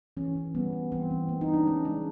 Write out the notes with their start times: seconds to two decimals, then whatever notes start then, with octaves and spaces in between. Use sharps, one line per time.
0.17 E3 C#4
0.35 E3
0.55 G3 B3
0.73 G3
0.92 E3 C4
1.11 E3
1.29 A#3
1.41 D#4
1.48 A#3
1.54 D4
1.67 G#3 C#4
1.85 G#3 D4